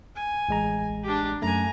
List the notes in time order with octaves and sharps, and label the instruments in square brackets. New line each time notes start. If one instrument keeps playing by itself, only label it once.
[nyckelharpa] G#5
[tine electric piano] A1 G#3 A#5
[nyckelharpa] D4 G4
[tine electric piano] F#2 A3 [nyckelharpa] G#5 A#5